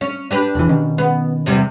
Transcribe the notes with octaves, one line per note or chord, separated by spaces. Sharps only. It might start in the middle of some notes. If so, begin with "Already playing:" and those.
C#4
D4 G4 B4
E1 E3
B2 D#3 C#4
B3
E2 C3 G3